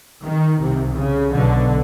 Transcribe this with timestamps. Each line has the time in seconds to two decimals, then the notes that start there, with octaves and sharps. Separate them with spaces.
0.24 D#3
0.60 C2 C3
0.96 C#3
1.32 B1 B2 D3